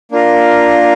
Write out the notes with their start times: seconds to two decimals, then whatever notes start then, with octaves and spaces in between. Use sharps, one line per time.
0.12 A#3 D4 F4 A#4